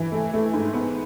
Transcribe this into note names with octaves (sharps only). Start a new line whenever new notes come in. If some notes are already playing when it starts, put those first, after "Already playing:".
Already playing: E3
A3
A3
G#2
B3